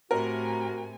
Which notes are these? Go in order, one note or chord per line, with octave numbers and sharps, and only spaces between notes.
A2 C3 F#4 A#4 G#5